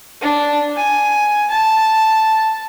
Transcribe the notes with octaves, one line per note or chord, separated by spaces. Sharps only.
D4
G#5
A5